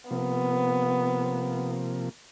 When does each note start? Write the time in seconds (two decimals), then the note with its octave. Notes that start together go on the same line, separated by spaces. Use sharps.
0.11 C3 F3 A#3 B3